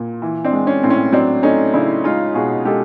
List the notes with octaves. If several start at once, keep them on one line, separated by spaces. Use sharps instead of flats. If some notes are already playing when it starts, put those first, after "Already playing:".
Already playing: A#2
E3
C4 D4
G#3
C#4
A2 C4
C#4
F#3 C4 D4
A3 C#4 D#4
C#3 D4 E4
G#3 D#4 F4
B2 F#4 G#4
G#3 G4 A4